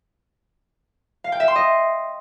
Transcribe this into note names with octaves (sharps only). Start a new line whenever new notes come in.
F5
G5
E5
C6
D#5